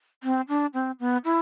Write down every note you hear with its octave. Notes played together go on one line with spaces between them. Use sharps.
C4
D4
C4
B3
E4